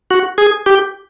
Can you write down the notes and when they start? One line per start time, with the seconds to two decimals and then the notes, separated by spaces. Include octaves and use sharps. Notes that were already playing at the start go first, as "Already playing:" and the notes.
0.11 F#4
0.38 G#4
0.66 G4